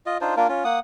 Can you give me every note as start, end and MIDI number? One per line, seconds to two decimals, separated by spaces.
0.06 0.18 65
0.06 0.18 75
0.21 0.35 62
0.21 0.35 63
0.21 0.35 65
0.21 0.35 72
0.37 0.47 58
0.37 0.47 62
0.37 0.47 65
0.37 0.47 70
0.48 0.64 61
0.48 0.64 65
0.65 0.79 58
0.65 0.79 78
0.65 0.79 87